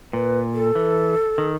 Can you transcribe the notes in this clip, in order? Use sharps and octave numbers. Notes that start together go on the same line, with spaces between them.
A#2 B4
A4
E3
D#3